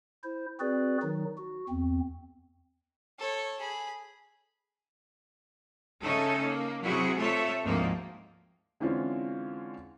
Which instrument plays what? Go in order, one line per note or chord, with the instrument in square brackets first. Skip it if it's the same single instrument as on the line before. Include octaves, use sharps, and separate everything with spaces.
[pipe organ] E4 C5
C4 F#4 G#4 B4 D5
D#3 F#3 D#4
F#4
E2 C4
[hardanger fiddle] A4 C#5
G#4 B5
[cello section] C#3 A3 C#4 D#4 A4
A#3
C3 F#3 E4 F#4 G#4
C3 A3 F4 A4 C#5 E5
D2 G#2 F3 G#3 A#3 C4
[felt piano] D3 E3 G#3 C4 C#4 F4